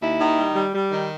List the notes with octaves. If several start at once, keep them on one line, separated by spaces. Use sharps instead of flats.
D#2 E4
D#3
G3
G3
G3
D#3